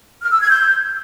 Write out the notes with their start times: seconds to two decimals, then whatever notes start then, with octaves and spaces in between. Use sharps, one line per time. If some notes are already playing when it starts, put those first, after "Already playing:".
0.22 F6
0.31 E6
0.41 G#6
0.50 G6